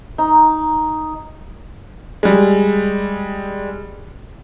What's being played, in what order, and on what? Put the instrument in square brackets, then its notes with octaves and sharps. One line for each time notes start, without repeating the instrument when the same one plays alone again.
[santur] D#4
[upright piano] G3 G#3